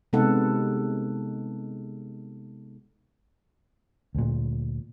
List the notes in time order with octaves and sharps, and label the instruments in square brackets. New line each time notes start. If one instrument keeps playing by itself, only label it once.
[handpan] C3 G#3 B3 D#4 A4 F#5
[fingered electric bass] D2 A#2